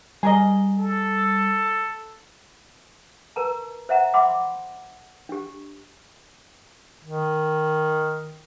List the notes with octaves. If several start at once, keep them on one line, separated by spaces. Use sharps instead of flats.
G3 G#4 A#4 D#5
A4
A#4 B4 A5 A#5
C5 E5 F#5 A#5
E5 F#5 B5 C6 D6
D4 G4
D#3